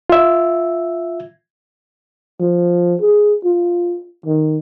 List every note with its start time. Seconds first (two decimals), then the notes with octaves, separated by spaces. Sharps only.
0.10 F4 E5
2.40 F3
3.01 G#4
3.44 F4
4.26 D#3